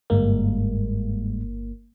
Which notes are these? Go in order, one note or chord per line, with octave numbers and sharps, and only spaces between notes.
G1 G#2 G3 G#3 A#3